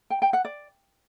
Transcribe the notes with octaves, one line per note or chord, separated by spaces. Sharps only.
G5
G5
F#5
D5